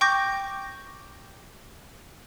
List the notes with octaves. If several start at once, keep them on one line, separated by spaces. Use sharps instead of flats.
G5 C#6 D6 G6 A#6